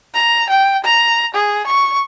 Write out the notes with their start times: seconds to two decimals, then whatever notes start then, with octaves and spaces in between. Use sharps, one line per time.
0.14 A#5
0.49 G5
0.84 A#5
1.34 G#4
1.67 C#6